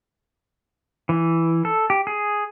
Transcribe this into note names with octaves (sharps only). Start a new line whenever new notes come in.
E3
A4
G4
G#4